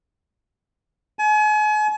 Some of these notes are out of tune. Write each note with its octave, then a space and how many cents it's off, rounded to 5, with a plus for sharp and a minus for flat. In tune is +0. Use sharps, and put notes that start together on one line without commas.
G#5 +40